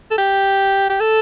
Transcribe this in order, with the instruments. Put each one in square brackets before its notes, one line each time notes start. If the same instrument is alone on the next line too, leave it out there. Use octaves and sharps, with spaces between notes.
[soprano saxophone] A4
G4
G4
A4